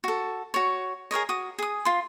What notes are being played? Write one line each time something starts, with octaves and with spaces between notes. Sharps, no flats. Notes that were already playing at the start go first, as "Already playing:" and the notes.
F#4 A4
F#4 C#5
G#4 A#4 C#5 D#5
F#4 D#6
G#4 D#6
F4 C6